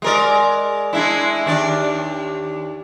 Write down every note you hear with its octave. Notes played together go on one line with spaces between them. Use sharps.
G#3 A#4 D5
G#3 D4 E4
D#2 D4 D5